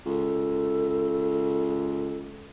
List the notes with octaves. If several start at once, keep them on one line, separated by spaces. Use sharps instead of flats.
C#2 A4